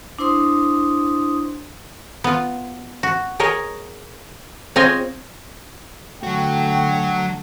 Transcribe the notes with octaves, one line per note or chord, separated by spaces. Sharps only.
D4 E4 C5 C6 D#6
B3 F4
F#4
G#4 A#4 C#5 D#5
C4 F4 G#4 C#5 D#5 G#5
D3 F#3 A3 F#4 G5